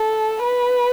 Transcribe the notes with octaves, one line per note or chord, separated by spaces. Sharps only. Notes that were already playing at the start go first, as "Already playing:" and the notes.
Already playing: A4
B4